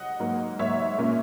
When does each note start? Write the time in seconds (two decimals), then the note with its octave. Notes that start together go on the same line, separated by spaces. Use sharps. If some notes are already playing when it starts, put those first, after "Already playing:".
Already playing: D#5 F#5
0.20 G#2 F#3 A#3
0.59 G#2 F#3 A#3 C#5 E5
0.98 A#2 A#3 C#4